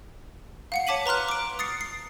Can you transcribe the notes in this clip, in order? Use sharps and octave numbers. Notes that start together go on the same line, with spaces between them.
F5 F#5 C#7
C#5 A5 D6 B6 D#7 F#7
B4 A#5 C6 F6 F#6
D6 D7
D#6 A6 C7 C#7
C7